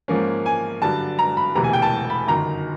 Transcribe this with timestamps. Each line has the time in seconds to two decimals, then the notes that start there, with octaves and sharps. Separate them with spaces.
0.08 G#2 F3 A#3 C#4
0.46 G#5
0.82 G2 D3 F#3 A5
1.19 A#5
1.37 B5
1.55 E1 D2 C3 E3 A#5
1.64 G#5
1.73 G5
1.82 A5
2.10 B5
2.28 G1 F#2 D#3 A#5